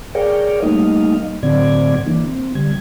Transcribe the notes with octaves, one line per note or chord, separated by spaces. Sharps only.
G#4 A#4 C#5 D5 F5 G5
G3 A3 A#3 D#4 D#5 F5
A2 D3 F#3 C4 D5 G#6
E3 A#3 D4
C4
D3 G3 G#6